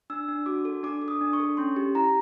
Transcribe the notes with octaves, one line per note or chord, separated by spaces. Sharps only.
D4 E6
D4
F#4 D6
A4
D4 D6
A4
D#6
D4
C#6
A4
C#4 C6
G4
E4 A#5